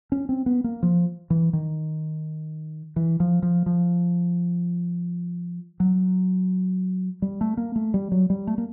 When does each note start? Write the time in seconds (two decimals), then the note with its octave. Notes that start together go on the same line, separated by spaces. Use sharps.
0.12 C#4
0.29 C4
0.46 B3
0.64 A#3
0.83 F3
1.30 E3
1.53 D#3
2.96 E3
3.20 F3
3.43 F3
3.66 F3
5.80 F#3
7.22 G3
7.41 A3
7.57 A#3
7.76 A3
7.94 G3
8.12 F#3
8.30 G3
8.47 A3
8.58 A#3